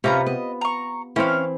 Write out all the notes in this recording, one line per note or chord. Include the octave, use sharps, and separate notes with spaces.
C3 C#4 F4 B4 F5 A#5
B3 D#5
A#5 C#6
E3 C4 C#4 F5